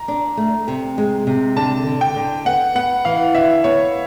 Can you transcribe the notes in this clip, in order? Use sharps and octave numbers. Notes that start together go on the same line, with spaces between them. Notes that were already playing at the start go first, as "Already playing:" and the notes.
Already playing: A#5
D4
A3
C3
G#3
C3
D3 A5
D3
G5
D3
B3 F#5
B3 F#5
E3 F5
D3 E5
B3 C#5